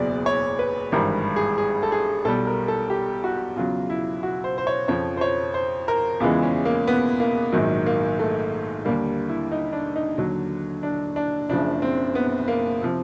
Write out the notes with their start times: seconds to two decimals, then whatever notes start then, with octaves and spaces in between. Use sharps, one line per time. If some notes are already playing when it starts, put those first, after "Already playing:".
Already playing: F#1 E2 B2 F#3 D5
0.26 C#5
0.59 B4
0.92 G#1 G2 E3 G3 A#4
1.36 G#4
1.58 G#4
1.83 A4
1.92 G#4
2.25 B1 B2 G3 A4
2.47 A#4
2.68 A4
2.90 G4
3.24 F#4
3.56 E2 C#3 F#3 F4
3.90 E4
4.23 F#4
4.44 C5
4.58 C5
4.67 C#5
4.88 F2 C#3 F3 C#5
5.17 C5
5.21 C#5
5.54 C5
5.88 A#4
6.20 E2 C#3 E3 G#3 F4
6.43 C#4
6.65 A#3
6.87 B3
7.20 A#3
7.52 A#1 G#2 D#3 F#3
7.86 A#3
8.20 A3
8.85 D#2 D3 G3 A#3
9.29 E4
9.52 D#4
9.73 D4
9.96 D#4
10.18 D#2 D3 F#3
10.83 D4
11.16 D4
11.50 F#1 F#2 C#3 F3 D4
11.82 C4
12.15 B3
12.48 A#3
12.82 C3 F3